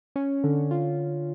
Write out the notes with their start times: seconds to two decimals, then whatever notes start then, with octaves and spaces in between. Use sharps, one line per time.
0.16 C#4
0.44 D3
0.71 F4